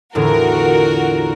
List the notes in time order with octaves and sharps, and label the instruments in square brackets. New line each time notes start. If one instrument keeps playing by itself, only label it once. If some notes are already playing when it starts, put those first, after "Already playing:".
[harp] E2 A2 D3 [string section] F4 F#4 A#4